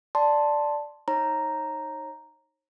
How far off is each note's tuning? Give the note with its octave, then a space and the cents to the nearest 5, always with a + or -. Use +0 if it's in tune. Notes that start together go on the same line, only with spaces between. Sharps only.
D5 +0 A5 +0 C6 +0
D#4 +0 C#5 -35 A#5 +0